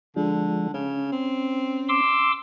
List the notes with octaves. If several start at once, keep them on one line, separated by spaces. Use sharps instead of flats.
D3 F3 G#3 D4
C#3 C#4
C4
C6 D6 E6